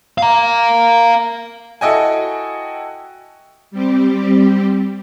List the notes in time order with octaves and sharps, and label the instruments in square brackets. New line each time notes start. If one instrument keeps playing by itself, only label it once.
[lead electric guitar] F5 A#5
[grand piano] E4 F#4 A4 D#5 G5 G#5
[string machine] G3 C4 G4